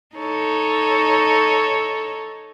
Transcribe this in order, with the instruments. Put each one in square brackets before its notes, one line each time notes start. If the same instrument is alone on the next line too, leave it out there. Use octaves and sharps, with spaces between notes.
[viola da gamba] D#4 A4 C#5